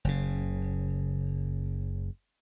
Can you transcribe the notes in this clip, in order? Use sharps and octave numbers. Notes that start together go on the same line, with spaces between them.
F#1 C#3